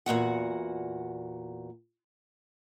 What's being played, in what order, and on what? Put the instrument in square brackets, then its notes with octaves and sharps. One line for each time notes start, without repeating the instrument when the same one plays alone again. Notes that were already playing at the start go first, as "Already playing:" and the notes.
[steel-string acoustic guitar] E2 A#2 F#4 F#5